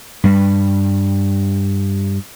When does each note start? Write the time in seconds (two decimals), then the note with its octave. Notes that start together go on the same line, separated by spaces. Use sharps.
0.24 G2 G3